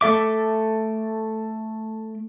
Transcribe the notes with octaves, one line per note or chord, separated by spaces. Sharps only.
A3 A4 E5 D6